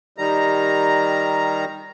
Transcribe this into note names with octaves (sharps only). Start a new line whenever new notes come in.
D#3 G3 A#5